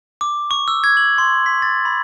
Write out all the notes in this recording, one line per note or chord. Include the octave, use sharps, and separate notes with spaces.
D6
C#6
E6
G#6
F#7
C6
B6
A6
B5